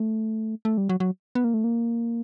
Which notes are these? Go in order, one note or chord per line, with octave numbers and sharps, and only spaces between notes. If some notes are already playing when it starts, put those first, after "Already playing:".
Already playing: A3
A3
G3
F#3
F#3
B3
A#3
A3
A#3